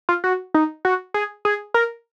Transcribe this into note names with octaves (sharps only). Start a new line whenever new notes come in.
F4
F#4
D#4
F#4
G#4
G#4
A#4